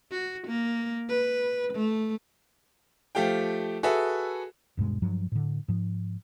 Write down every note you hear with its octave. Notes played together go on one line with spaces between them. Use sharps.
F#4
A#3
B4
A3
F3 A3 G4 F5 G5
F#4 G#4 A4 B4 E5
D#1 G2 B2 G#3
G2 F3 F#3
A2 D3
G#2 F3